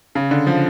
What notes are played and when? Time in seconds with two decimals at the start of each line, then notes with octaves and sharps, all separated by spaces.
0.15 C#3
0.31 D3
0.47 F3